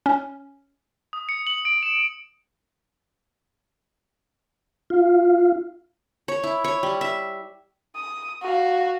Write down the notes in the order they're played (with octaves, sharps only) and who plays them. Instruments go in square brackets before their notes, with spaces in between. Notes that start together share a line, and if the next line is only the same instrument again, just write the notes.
[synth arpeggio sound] C#4
[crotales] D#6
C#7
F#7
D7
E7
[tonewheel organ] F4
[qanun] C#5
E4
C#5
G3
E5
[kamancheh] D#6
F#4 F5